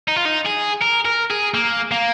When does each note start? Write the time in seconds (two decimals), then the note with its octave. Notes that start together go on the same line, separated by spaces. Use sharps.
0.08 D#4
0.16 F4
0.25 D#4
0.45 G#4
0.82 A#4
1.05 A#4
1.31 G#4
1.54 A#3
1.91 A#3